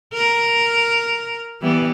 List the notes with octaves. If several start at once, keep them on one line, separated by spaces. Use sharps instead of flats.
A#4
E3 G3 B3